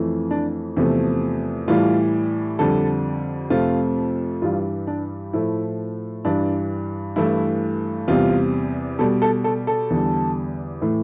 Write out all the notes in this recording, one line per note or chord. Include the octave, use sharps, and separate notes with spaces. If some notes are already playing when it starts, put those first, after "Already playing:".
Already playing: F2 E3 A3
D4
E2 C3 F3 A3
A2 E3 G3 F4
F2 D3 G3 A4
F2 C3 F3 A3 F4
G2 E3 G3 F4
D4
A2 F3 A3 E4
G2 E3 G3 D4
G2 E3 A3 E4
E2 C3 G3 F4
B2 G3 A4
A4
A4
A4
E2 D3 G3
A2 E3 A3